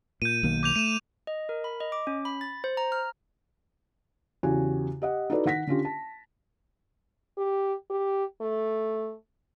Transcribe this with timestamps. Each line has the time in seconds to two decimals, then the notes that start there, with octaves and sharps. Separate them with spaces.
0.22 A#2 G6 D#7
0.43 B1 D#3 A#3
0.63 D6 G6 F7
0.76 A3 D#7 E7
1.27 D#5
1.49 A#4
1.64 B5
1.80 D#5
1.92 D6
2.07 C#4
2.25 B5
2.41 A6
2.64 C5
2.77 A#5
2.92 F6
4.43 E2 C#3 F#4 G4 G#5
5.02 G4 D#5 F#5
5.30 D#4 E4 F#4 A4 B4 D5
5.45 D#3 F#5 A#6 B6
5.67 D3 C#4 F4 G4
5.85 A5
7.38 G4
7.90 G4
8.41 A3